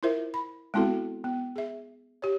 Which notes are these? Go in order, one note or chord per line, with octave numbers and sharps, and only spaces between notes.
E4 F4 A#4 C5 E5
B5
G#3 B3 C4 E4 F#4 A4
B3
G#4 E5
G4 C#5